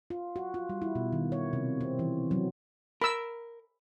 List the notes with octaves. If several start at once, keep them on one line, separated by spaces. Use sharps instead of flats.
F4
F#4
F4
G3
E4
B2
D#3
C#5
C3
C4
E3
F#3
A#4 B5 E6